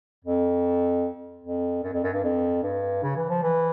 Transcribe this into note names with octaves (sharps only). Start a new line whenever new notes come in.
F2
F2
F#2
F2
F#2
G2
F2
G2
C#3
E3
F3
E3